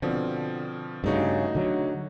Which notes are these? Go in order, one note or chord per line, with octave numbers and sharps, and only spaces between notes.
B2 D3 F3 C4
G2 C#3 A3 D#4 F#4
D3 F#3